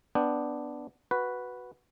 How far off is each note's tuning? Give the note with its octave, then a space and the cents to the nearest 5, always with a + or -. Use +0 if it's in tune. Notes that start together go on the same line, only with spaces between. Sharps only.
B3 +0 D4 +0 G5 +10
F#4 +0 B4 +0